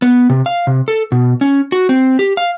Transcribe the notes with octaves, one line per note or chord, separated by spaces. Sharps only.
B3
C3
F5
C3
A4
B2
C#4
F#4
C4
G4
F5